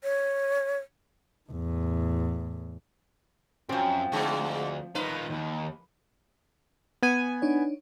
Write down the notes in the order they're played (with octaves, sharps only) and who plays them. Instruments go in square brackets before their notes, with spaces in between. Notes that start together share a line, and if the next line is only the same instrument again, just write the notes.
[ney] C#5
[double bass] E2 A2
[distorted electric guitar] F#2 [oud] F3 C4
[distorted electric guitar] D2 [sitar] G#2 G#3
[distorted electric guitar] D#3 F4 [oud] D#4 [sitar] B4
[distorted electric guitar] D#2
[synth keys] B3 G#5
[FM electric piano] D4 D#4 C#5